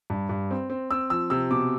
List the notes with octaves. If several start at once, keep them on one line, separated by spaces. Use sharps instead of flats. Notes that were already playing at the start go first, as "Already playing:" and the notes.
G2
G2
C4
C4
C4 E6
F3 E6
C3 E6
B2 D6